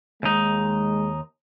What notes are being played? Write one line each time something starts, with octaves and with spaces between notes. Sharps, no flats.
D#2 G#3 D#4